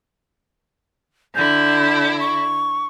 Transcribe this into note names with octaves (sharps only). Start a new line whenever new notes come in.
D3 E4 G6
C#6